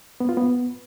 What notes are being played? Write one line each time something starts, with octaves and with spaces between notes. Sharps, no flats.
B3
F4
B3